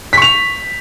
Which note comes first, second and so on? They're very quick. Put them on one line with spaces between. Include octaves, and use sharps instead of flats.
B6 C#6 F7